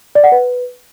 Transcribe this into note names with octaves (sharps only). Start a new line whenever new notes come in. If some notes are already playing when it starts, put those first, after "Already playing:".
D5
F#5
B4